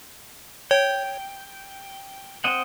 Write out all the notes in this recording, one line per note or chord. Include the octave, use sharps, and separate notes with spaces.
C#5 G5
C4 D#5 F#5